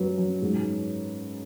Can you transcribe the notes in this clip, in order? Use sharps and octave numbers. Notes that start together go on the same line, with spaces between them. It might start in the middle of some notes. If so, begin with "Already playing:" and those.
Already playing: F#2 F#3 B4
F#2
G#2